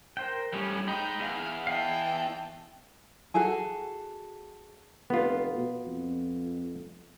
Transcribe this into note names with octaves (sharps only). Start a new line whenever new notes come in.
A#4 C5 G5
A2 G3 C#4
G#3 D#4 G5 B5
E2 F5
D#5 F5 G5 A5
F#4 G#4 A4 G#5
F1 B3 F4
B2
F2